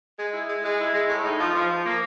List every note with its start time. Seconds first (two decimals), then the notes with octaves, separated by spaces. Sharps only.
0.18 G#3
0.33 E4
0.48 G#3
0.63 G#3
0.78 E4
0.93 G#3
1.09 A2
1.24 D#4
1.39 F3
1.55 F3
1.69 F3
1.85 A#3